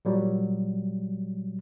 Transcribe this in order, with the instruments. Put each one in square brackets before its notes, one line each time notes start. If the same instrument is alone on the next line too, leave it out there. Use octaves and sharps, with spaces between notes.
[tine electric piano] A#2 F#3 G3